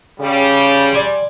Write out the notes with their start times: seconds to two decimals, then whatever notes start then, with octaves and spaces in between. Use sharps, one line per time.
0.20 C#3 G3
0.93 D5 G#5 C6